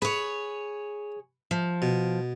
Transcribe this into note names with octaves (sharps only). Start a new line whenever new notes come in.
G#4 B4 C#5
F3
B2